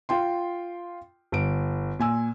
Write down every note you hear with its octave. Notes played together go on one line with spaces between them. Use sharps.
F4 G5 C6
G1 D7
A#2 G#5 E6